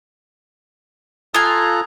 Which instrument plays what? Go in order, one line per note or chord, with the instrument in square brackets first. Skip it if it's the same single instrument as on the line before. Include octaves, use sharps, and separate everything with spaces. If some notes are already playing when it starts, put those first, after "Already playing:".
[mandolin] F4 G#5 [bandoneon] A4 A#5 F#6 [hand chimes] D#6